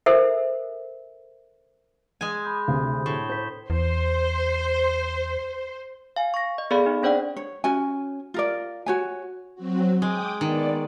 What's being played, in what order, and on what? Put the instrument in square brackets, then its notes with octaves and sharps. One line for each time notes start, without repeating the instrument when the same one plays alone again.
[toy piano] A4 A#4 C5 E5
[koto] G#3 G#5
[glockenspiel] B5 D#6 G6
[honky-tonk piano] D2 C3
[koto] A2 [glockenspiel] C#6 E7 G7
[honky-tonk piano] C5 [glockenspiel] G6 B6
[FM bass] E2 [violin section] C5
[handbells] F5 G#5
C#6 A#6
D#5
B3 G#4 A4 D5 F5 B5
D#4
C4 D4 C5 D5 F#5 G5
[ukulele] C#5
C#4 F#4 G#5
F4 A#4 D5
F#4 C#5 G#5
[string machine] F#3 C4 F#4
[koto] G#3 [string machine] G5 D6 D#6
[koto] D#3 [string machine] B3 D5